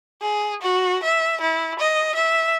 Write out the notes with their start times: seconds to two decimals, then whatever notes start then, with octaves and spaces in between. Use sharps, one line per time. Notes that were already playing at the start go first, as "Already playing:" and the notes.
0.21 G#4
0.62 F#4
1.03 E5
1.41 E4
1.79 D#5
2.15 E5